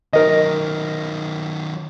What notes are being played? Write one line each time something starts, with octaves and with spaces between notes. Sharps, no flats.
D#3 F#3 A#4 D#5